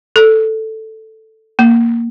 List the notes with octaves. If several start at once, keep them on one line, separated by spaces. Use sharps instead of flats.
A4
A#3